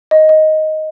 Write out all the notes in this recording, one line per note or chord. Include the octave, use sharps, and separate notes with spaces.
D#5
D#5